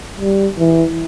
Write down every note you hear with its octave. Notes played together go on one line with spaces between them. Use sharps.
G3
E3